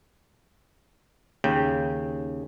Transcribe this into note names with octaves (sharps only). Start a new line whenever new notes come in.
D#2 C#3 G5